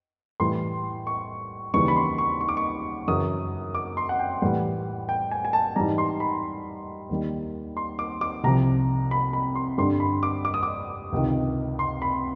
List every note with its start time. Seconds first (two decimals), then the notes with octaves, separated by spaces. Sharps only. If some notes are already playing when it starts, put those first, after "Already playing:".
0.40 A2 E3 G3 C6
1.07 C#6
1.74 D#2 C#3 E3 G3 C#6
1.88 B5
1.96 C6
2.18 C#6
2.41 C#6
2.49 D6
2.57 C#6
3.07 F#2 C#3 E3 D#6
3.75 D6
3.97 C6
4.09 F#5
4.19 G5
4.42 A2 E3 G3 F#5
5.09 G5
5.31 G#5
5.45 G#5
5.53 A5
5.76 G#2 E3 G3 A#5
5.98 C6
6.20 B5
7.09 D#2 D#3 G3
7.77 C6
7.99 D6
8.21 D6
8.44 C2 C3 F3 A#5
9.11 B5
9.33 B5
9.55 C6
9.78 G2 D3 G3 C6
10.00 B5
10.23 D6
10.45 D6
10.54 D#6
10.63 D6
11.12 C#2 C3 D#3
11.79 C6
12.02 B5